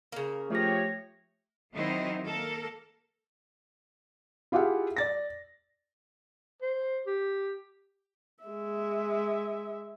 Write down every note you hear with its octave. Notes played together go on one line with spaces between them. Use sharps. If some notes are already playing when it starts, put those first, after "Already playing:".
C#3 A#3
F3 A3 G4 C#5 A#6
D#3 F#3 C4 D#4 E4
A#3 A4 A#4
E4 F4 G4 G#4 E5 F#5
D5 A6 A#6
C5
G4
G#3 E5